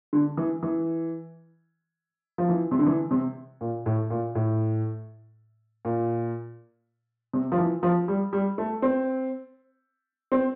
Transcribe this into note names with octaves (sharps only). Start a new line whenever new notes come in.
D3
E3
E3
F3
E3
C3
D3
E3
C3
A#2
A2
A#2
A2
A#2
C3
F3
E3
F3
G3
G3
A3
C4
C4